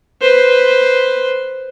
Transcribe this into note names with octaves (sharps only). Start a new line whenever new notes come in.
B4 C5